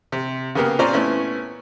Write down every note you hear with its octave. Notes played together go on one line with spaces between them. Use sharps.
C3
C#3 A#3 B3 G4 A#4
A#2 C4 C#4 C5 D5 A#5
A3 B3 C#4 E4